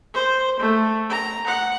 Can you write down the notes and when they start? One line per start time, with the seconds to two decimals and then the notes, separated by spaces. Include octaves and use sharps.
0.15 C5
0.60 A3
1.10 A#5
1.47 F#5